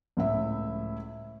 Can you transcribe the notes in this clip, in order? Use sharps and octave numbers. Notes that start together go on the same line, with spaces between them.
C#2 A2 E5